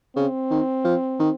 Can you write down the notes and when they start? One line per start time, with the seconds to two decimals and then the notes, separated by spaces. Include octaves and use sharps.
0.16 C#3 C4
0.51 D#3
0.84 F3
1.19 D#3